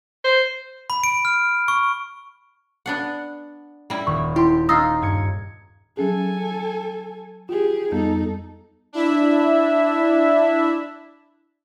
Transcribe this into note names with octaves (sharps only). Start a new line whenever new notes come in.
C5
B5
D7
F6
C#6
B3 D4 F#5
G3 E4
D#1 C#6
E4 G4 C6
D#4 F4 D#6 E6 A#6
G2 G#6 C#7
F#3 C#4 G#4 A4 G#5
F4 G4 G#4
F2 G3 B3 D#4 A4
D4 E4 E5